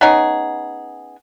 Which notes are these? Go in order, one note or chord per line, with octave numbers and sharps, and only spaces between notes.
B3 C#4 D#4 G#4